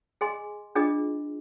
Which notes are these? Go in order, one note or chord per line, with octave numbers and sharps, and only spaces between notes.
G#4 D#5 G#5 C6
D4 F4 G#4 D#5